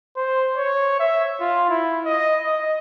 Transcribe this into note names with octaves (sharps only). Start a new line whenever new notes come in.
C5
C#5
E5
F4
E4
D#5
D#5